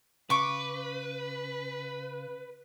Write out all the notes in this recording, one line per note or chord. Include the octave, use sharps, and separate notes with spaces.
C#3 B4 C#6 D6